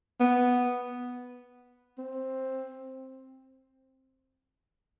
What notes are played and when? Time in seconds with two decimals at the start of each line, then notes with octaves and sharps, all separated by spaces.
0.20 B3
1.98 C4